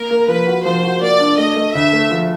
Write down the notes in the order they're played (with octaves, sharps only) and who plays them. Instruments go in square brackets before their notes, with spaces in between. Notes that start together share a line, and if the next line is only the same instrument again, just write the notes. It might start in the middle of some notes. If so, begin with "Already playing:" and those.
Already playing: [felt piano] A#3 [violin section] A#4
[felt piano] A#3
[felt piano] F3 [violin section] B4
[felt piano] F#4
[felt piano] F3 [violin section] C5
[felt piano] F#4
[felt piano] A#3 [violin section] D5
[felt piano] D4
[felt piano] A3 [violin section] D#5
[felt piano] A3
[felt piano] D2 [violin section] E5
[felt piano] A3
F3